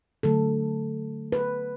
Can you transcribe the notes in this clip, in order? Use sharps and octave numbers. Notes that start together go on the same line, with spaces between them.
D3 F#3 A3 A4
B4